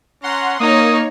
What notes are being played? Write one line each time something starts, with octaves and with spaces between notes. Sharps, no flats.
C#4 F#5 A#5 C6
A#3 D#4 C#5 D#6